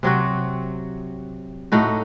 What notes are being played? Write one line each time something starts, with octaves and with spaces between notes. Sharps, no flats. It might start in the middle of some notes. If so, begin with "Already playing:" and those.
C3 F#3 C4 F#4
A2 A3 D#4 F#4